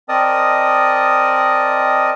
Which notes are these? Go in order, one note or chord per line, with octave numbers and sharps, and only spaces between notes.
C4 A#4 D5 D#5 A5 D#6